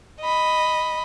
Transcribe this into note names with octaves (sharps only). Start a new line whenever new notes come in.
D#5 B5